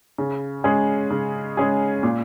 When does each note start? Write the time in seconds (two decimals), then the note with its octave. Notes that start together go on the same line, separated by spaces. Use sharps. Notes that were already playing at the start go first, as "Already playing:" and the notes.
0.18 C#3
0.64 G#3 C#4 G#4
1.11 C#3
1.57 G#3 C#4 G#4
2.03 A#2